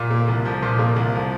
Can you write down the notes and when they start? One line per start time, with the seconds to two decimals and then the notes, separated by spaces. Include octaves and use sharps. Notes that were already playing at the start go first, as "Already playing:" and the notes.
Already playing: A#2
0.10 A#3
0.28 C2
0.45 F3
0.63 A#2
0.79 A#3
0.96 C2
1.14 F3